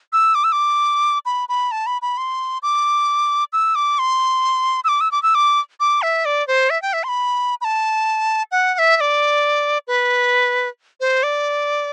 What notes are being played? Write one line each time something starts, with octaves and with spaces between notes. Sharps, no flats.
E6
D6
E6
D6
B5
B5
A5
B5
B5
C6
D6
E6
D6
C6
E6
D6
E6
D6
E6
D6
D6
E5
D5
C5
E5
G5
E5
C6
B5
B5
A5
F#5
F#5
E5
E5
D5
B4
C5
D5